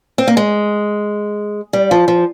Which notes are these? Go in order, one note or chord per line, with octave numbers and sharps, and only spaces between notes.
C4
A#3
G#3
G3
F3
F3